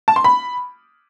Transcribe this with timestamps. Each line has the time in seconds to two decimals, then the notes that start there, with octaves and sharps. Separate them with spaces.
0.08 A5
0.16 C6
0.24 B5